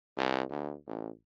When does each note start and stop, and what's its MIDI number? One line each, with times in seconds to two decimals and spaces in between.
0.17 0.42 36
0.50 0.73 38
0.87 1.09 33